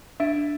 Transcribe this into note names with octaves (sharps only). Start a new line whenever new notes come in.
D4 E5